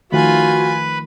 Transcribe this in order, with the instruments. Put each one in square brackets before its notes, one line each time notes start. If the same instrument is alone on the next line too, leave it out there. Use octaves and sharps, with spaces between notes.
[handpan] D#3 F3 A3 [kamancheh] F4 G#5 [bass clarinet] F#4 [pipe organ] B4 B5